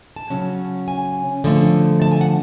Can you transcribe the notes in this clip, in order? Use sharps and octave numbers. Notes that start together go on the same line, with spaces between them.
A5
C#3 F#3 C#4
G#5
D3 F3 A3
A5
G#5
F#5